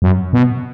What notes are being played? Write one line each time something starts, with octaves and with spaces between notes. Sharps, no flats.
F#2
B2